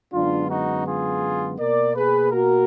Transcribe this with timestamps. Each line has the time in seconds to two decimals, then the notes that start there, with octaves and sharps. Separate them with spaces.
0.13 F#2 D3 G#3 B3 D4 F4
0.49 D#4 F#4
0.86 F4 G#4
1.59 B2 A#3 A#4 D5
1.95 G#4 B4
2.31 F#4 A#4